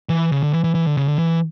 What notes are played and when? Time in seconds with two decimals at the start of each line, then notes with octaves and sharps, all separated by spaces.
0.09 E3
0.32 C#3
0.43 D3
0.53 E3
0.64 E3
0.75 E3
0.87 D3
0.97 C#3
1.08 D3
1.19 E3